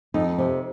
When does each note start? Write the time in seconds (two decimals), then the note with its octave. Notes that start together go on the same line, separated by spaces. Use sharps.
0.14 F2 D#4
0.38 C3